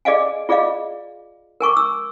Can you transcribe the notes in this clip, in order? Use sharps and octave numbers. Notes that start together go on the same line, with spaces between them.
G#4 D5 D#5 F5 G#5
F4 G#4 D5 D#5 F5
A#4 G#5 C#6 D6
E6